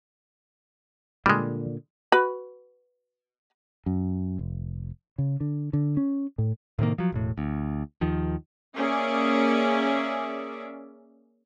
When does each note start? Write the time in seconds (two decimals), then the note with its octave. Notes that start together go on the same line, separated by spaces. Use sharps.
1.26 A#2 D3 G3 G#3
2.12 F#4 B4 B5
3.86 F#2
4.39 F1
5.18 C#3
5.40 D3
5.73 D3
5.97 C#4
6.38 A2
6.79 A2 C3 D#3 A#3
6.98 F3 F#3
7.12 E1 A2
7.38 D2
8.01 D#2 D#3 F3
8.76 A#3 C#4 G#4 D5 E5